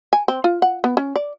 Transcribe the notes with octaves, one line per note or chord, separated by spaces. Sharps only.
G#5
C4
F4
F#5
B3
C#4
D5